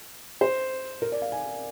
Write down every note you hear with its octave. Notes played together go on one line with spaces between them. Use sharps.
C5
A#4
D5
F5
G#5